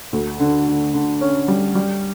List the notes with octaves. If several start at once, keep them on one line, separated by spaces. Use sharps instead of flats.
D2
D3
D3
D3
C#4
G3
G3